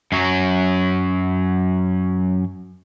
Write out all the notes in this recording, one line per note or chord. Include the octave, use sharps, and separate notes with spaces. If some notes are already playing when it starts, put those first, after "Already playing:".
F#2 F#3